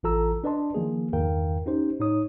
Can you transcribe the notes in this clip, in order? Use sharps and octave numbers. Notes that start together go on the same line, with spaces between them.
A1 E3 F4 A4 A#5 E6
D4 B4 D5 D#5 A5 C6
D#3 F3 A#3 G#4
E2 G2 D#3 A#4 F5 G5
C#4 D#4 G4 C5
A2 D#4 C#5 D#6